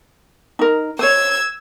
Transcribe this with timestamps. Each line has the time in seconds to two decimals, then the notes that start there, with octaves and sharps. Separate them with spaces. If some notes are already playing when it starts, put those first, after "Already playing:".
0.59 D#4 A#4
0.99 C5 C#5 E6 G#6